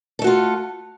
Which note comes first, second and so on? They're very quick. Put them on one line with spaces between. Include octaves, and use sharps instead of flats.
A4 A3 F#4 F4